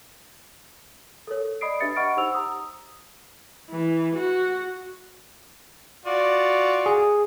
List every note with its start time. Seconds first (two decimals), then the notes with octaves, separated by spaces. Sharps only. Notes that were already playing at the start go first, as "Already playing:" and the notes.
1.27 A4 A#4 C#5
1.61 D5 D#5 B5 D#6 C7 D7
1.80 D4 G4 B4 E5 A6 C#7
1.96 D#5 F#5 B5 C#6 F6 D7
2.17 D#4 G4 C5 F#5 E6 F7
2.32 A#5 D#6 E6
3.71 E3
4.15 F#4
6.06 F4 F#4 D5
6.86 G#4